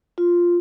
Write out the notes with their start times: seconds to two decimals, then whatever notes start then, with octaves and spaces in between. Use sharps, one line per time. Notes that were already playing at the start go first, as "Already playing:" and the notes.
0.18 F4